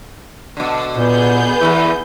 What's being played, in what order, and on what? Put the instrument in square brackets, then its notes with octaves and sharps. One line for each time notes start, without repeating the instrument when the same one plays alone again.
[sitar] B2 D3
[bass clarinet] A#2 [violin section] B3 G#4 G6
[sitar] E2 G2 E3 [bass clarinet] E4